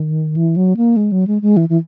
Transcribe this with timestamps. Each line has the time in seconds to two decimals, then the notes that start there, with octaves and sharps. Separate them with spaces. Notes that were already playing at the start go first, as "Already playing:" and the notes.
Already playing: D#3
0.36 E3
0.56 F#3
0.77 A#3
0.97 G#3
1.12 F#3
1.27 G#3
1.42 G#3
1.57 E3
1.69 E3